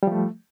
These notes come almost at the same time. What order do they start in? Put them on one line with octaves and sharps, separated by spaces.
G3 F3 A3